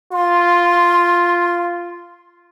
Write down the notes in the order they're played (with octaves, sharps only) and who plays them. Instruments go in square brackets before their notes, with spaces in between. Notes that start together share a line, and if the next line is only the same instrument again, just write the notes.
[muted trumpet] F4 [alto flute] C6